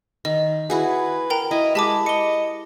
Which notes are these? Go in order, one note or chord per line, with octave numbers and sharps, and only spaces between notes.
D#3 D#5
E4 F#4 G#4 B4
A#4 G5 A#5
E4 D#5
G#3 G4 A5 B5 D6
D#5 C#7 G7